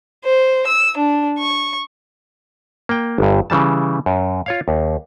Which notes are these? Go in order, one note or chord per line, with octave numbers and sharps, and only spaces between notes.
C5
E6
D4
C#6
A#3 G5
G1 G2
C#3 E3 G3 A5
F#2
F4 C#5 F5
D#2